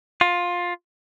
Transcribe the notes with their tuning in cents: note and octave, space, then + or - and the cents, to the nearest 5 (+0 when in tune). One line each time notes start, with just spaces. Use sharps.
F4 +15